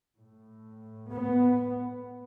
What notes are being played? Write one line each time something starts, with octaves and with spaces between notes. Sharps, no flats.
A2
B3